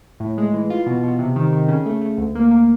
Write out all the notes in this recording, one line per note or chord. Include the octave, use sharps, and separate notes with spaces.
A2
G#3
E3
F4
B2
B2
C3
D#3
D#3
C#3
A3
A3
D2
A#3
A#3